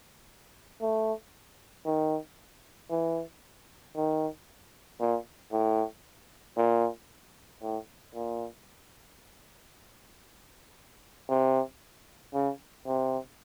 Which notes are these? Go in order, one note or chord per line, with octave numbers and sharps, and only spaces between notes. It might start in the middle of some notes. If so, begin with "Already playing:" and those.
A3
D#3
E3
D#3
A#2
A2
A#2
A2
A#2
C3
C#3
C3